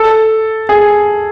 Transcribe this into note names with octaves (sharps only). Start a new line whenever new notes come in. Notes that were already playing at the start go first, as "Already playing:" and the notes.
Already playing: A4
G#4